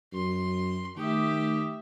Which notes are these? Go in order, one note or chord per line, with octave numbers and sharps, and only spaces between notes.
F#2 C6
D#3 A3 G4 E5 D6 D#6